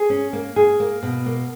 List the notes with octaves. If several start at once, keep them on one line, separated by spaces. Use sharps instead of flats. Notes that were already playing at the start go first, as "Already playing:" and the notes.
Already playing: G#4
C#4
A#3
G#4
A#3
B2
A#3